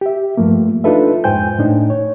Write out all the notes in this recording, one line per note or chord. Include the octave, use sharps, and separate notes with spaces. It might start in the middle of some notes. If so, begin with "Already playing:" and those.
G4 E5
G2 F3 A3 A#3
D4 D#4 F4 A4 B4 E5
F2 G#2 C5 G5 G#5 G6
A2 D4 D#4
C#5